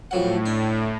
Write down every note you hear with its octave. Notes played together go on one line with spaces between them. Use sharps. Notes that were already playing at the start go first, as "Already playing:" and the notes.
F2 A2 F#3 F#5
D4